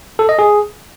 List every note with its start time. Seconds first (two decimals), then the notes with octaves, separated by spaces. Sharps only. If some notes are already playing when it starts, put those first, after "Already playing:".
0.19 A4
0.29 D#5
0.39 G#4